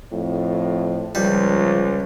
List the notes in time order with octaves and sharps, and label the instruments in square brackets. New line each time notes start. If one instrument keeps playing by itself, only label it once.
[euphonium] F2 [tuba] A2
[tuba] C#2 [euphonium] F3 [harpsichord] G3